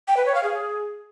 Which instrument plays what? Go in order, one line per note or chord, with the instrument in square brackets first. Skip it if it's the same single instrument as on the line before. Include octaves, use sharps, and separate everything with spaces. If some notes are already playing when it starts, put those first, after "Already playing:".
[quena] G5
B4
C#5
F5
G#4